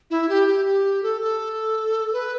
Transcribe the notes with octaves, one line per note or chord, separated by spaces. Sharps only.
E4
G4
G4
G4
A4
A4
B4